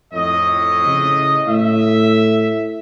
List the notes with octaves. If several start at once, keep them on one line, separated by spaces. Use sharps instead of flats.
F2 A2 D#5
C#3
A2 E5